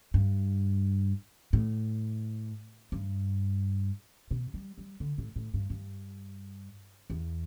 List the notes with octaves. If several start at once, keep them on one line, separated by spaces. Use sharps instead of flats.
G2
A2
G2
B2
G3
G3
D3
A2
A2
G2
G2
E2